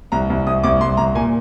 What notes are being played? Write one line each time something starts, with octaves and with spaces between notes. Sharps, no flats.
C2 A#5
C2
C2 D#6
C2 D6
C2 C6
C2 A#5
A#2 G#5